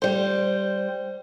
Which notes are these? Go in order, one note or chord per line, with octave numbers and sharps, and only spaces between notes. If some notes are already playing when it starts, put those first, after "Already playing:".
G3 C5